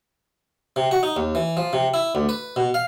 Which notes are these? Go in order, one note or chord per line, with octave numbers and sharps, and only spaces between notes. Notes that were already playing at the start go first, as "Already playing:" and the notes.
C3
F#4
D#4
D#2
E3
F3
C3
E4
D2
B4
B2
F5